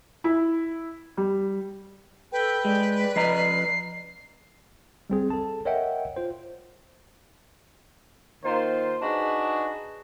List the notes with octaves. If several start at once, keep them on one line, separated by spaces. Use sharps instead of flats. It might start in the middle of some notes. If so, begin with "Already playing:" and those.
E4
G3
A4 B4 G5
G#3 D5
F3 D#5 A#5 C7
G3 C4 G#4
A4 A5
A#4 C#5 D#5 E5 F#5 G5
F4 C5
D#3 A#3 F4 C5
D4 D#4 F#4 G#4 B4